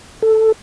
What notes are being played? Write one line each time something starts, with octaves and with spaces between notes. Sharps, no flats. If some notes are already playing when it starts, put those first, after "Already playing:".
A4